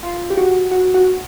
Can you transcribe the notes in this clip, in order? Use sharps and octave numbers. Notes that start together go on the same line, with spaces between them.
F4
G4
F#4
F#4
F#4